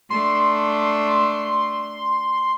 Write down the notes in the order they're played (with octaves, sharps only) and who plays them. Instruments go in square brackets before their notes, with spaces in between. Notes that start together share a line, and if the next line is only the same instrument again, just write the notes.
[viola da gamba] A3 D4 [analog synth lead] C6